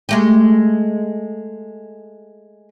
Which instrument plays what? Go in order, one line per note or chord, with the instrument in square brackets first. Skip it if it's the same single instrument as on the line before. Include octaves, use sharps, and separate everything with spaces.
[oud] G#3 A3 G4